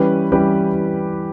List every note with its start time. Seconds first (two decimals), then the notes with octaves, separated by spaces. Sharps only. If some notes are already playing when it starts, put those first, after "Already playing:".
Already playing: E3 G3 C#4 G4 B4
0.32 E3 G3 C#4 G4 B4